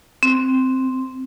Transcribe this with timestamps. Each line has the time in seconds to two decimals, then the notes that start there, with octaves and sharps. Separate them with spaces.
0.23 C4